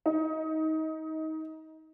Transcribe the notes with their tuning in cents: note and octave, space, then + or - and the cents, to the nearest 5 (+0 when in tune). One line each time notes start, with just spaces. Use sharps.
D#4 +20